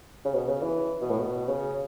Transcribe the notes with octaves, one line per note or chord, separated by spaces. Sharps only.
C#3
B2
C#3
E3
B2
A2
B2
C#3